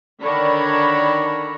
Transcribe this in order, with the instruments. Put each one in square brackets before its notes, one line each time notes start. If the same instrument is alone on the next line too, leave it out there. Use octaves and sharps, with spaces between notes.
[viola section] D3 D#3 D4 C#5 A#5 B5